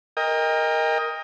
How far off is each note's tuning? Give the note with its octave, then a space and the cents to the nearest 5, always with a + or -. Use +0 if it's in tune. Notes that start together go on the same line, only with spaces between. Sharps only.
A#4 +0 D#5 +10 G5 +35